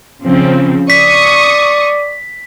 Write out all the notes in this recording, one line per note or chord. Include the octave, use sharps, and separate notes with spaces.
C#3 F3 C4
D5 C#6 D#6 B6